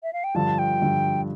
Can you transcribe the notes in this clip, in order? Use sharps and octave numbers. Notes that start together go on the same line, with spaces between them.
E5
F5
G5
G2 D3 F3 A5
G5
G2 D3 F3